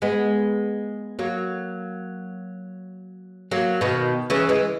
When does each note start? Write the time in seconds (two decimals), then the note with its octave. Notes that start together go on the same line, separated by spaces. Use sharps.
0.02 G#3 B3
1.19 F#3 A#3
3.51 F#3 A#3
3.81 B2 D#3
4.30 C#3 E3
4.49 E3 G#3